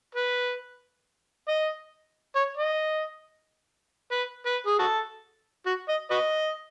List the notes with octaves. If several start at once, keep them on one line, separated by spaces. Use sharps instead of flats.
B4
D#5
C#5
D#5
B4
B4
G#4
F#4 A4
F#4
D#5
F#4 B4 D#5